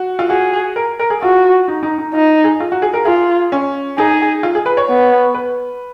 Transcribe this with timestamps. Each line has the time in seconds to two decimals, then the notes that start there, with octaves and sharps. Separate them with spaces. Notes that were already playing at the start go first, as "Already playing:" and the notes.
Already playing: F#4
0.19 F4
0.30 F#4 G#4
0.76 A#4
1.00 A#4
1.10 G#4
1.22 F4 F#4
1.68 D#4
1.83 D#4
1.98 D#4
2.14 D#4 F4
2.44 G#4
2.60 F4
2.72 F#4
2.82 G#4
2.94 A#4
3.05 F4 G#4
3.52 C#4
3.98 D#4 G#4
4.43 F4
4.55 G#4
4.66 B4
4.77 C#5
4.89 B3
5.35 B4